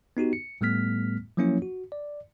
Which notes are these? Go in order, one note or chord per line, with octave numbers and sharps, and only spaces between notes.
B3 D#4 F#4 G4
C#7
A2 G3 A3 B3 F6 B6
F3 F#3 A#3 C#4 E4 C#5
F#4
D5